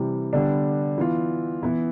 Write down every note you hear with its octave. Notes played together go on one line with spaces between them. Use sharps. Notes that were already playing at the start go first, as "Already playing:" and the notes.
Already playing: C3 E3 G3
D3 G3 B3 D4
E3 B3 F4
E3 B3 E4